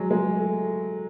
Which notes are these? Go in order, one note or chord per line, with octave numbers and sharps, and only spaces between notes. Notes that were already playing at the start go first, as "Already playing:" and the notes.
Already playing: F#3 G#3
G#3
A3